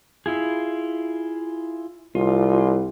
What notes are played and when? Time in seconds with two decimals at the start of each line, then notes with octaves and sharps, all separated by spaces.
0.26 E4 F4 G#4
2.15 C2 F4